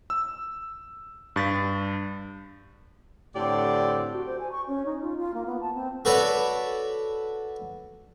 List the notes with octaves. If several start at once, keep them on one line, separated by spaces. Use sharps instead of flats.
E6
G2 A6 B6
A2 D3 C4 G4 D5
F#4
C5
G#5
C#6
C#4
D#4
F4
F4
A#3
B3
A5
C4
F#4 A4 B4 C#5 D5